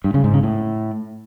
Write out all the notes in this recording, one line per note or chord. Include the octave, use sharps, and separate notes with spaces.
G2
C#3
G#2
C#3
A2